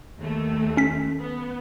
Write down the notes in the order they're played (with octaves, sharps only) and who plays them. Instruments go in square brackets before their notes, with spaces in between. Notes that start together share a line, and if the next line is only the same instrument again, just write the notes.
[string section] D#2 A3
[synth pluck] C#4 B6
[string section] B3